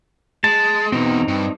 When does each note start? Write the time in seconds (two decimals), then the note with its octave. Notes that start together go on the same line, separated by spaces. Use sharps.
0.44 G#3 A5
0.92 E2 B2 C4 D#4
1.28 G2